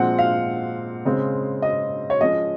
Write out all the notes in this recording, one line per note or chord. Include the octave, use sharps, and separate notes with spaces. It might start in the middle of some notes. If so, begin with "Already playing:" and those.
Already playing: A#2 F3 G#3 C4 F#5
F5
C#3 G#3 C4
D#5
C#5
F3 G#3 C#4 D#5